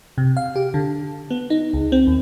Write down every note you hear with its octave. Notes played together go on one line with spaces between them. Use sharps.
C3
F5
G4
D3
B3
D#4
C#2
C4
D#2